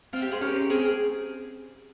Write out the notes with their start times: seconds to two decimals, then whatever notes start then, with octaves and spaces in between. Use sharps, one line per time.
0.13 C4 F4
0.22 G4
0.32 G#4 C5
0.41 C#4 G4 A#4
0.70 C4 G#4
0.85 G#4